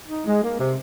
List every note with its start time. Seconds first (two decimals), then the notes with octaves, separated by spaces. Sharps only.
0.09 D#4
0.26 G#3
0.43 A#3
0.59 C3